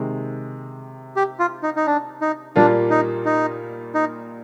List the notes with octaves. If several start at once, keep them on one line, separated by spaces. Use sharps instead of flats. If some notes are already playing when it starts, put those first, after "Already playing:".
Already playing: C3 D#3 G#3
G4
F4
D#4
D#4
D4
D#4
A#2 G3 A#3 D4 F4
D#4
D#4
D#4